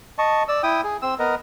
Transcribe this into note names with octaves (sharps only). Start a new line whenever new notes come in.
D#5 A5 C#6
D5 E6
E4 G5 D#6
G#4
C4 E6
B3 A#4 D#5